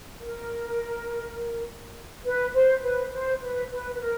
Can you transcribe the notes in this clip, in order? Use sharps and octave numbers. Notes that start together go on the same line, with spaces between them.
A#4
B4
C5
B4
C5
B4
B4
B4
A#4